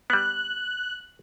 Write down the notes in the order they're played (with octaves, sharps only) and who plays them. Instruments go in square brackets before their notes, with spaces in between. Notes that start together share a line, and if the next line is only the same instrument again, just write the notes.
[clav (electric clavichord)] G3 B3 [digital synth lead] F#6